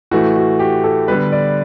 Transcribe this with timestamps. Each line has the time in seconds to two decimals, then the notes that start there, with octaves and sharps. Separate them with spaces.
0.11 A2 E3 A3 F#4
0.36 F#4
0.59 G4
0.84 A4
1.08 D3 G3 B3 B4
1.32 D5